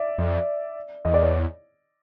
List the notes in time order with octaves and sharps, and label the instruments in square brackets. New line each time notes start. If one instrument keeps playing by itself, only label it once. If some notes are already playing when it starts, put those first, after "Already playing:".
Already playing: [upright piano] D5 E5
[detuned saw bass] F2
[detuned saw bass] E2 [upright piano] D#5
[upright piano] D5
C#5